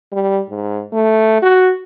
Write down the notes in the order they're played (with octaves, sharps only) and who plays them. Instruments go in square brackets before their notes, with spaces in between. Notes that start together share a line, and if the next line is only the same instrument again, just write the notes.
[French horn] G3
G#2
A3
F#4